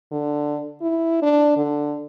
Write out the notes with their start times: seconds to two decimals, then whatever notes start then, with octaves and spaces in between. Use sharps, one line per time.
0.12 D3
0.81 E4
1.22 D4
1.57 D3